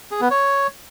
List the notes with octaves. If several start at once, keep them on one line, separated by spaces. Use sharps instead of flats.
G#4
B3
C#5